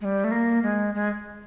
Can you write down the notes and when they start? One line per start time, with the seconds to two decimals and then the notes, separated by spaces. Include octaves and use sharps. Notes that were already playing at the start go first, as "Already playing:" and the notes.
0.01 G#3
0.05 G3
0.24 A3
0.31 A#3
0.63 G#3
0.95 G#3